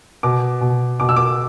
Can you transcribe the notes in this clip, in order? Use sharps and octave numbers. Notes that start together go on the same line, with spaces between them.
B2 D6
B2
B2 D6
E6
D6